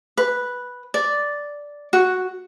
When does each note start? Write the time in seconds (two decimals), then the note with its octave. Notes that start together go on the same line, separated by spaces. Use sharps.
0.17 B4
0.94 D5
1.93 F#4